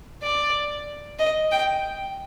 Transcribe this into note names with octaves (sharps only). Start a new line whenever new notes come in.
D5
D#5
G5